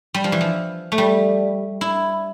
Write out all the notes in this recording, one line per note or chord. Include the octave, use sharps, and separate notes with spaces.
G3
F3
E3
F3
A3
G3
E4